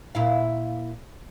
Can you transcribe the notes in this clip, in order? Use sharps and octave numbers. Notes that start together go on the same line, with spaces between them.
A#2 E4 F5